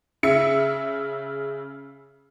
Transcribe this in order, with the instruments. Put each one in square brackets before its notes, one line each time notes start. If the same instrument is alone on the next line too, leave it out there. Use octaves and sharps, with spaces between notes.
[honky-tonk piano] C#3 E5 C#7